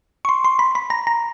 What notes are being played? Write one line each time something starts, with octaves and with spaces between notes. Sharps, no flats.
C#6
C6
C6
B5
B5
A#5
A#5